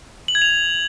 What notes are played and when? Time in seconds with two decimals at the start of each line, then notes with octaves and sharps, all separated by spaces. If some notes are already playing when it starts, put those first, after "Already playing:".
0.28 F#7
0.35 G#6
0.42 F7